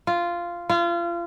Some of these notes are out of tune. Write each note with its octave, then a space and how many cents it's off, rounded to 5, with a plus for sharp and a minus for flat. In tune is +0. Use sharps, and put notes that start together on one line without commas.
F4 -10
F4 -30